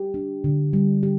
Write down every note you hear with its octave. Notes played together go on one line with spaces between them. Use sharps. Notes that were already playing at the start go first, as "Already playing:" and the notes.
Already playing: G4
D4
D3
G3
G4